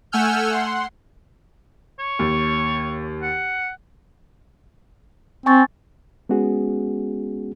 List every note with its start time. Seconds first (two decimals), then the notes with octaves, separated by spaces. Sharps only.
0.12 A3 F#5 G#5 E6 F6 G6
0.51 F#5 C6
1.99 C#5
2.19 D#2
3.23 F#5
5.46 C4 G#5 C#6 A6
6.29 G#3 B3 C#4 F#4 G#4